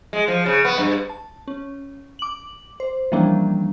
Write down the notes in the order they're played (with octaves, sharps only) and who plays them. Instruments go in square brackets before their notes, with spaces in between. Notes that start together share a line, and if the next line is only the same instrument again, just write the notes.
[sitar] G#3
F3
C#3
B3
G2
[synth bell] A5
C#4
D6 F#7
C5
E3 F3 G3 A#3 C#4 D4